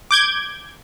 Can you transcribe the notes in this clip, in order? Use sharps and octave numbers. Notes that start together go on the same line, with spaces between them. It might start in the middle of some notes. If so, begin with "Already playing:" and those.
D6 G6 G#6